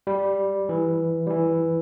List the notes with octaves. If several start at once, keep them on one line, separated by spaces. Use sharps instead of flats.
G3
E3
G3
E3